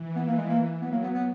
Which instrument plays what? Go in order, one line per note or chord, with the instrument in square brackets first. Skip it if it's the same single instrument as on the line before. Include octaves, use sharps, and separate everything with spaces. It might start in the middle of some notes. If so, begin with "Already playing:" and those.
Already playing: [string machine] E3
[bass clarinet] B3
A#3
G#3
A#3
[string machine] F#3 [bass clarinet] B3
[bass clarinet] A#3
B3
B3